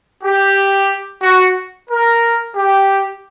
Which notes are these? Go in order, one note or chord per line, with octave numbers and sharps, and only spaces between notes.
G4
F#4
A#4
G4